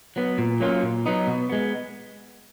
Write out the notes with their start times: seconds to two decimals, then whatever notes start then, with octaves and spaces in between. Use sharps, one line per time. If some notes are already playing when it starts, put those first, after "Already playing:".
0.16 F#3 B3
0.38 A#2
0.60 F#3 A#3 C#4 F4
0.82 A#2
1.06 F#3 B3 D#4
1.27 B2
1.49 G#3 B3